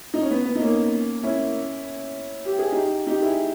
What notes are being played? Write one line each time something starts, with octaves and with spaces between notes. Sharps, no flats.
D#4
C#4
B3
B3
D#4
A#3 C#4
C#4 E4
G4
G#4
D#4 G4
D#4 G4
E4 G#4